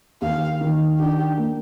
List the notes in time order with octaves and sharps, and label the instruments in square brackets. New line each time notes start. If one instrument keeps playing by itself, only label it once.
[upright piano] D#2 [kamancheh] F5
[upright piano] D#3
[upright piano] D4 [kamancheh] G4
[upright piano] A#3